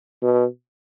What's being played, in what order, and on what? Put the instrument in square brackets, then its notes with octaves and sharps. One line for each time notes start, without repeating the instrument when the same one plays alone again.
[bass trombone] B2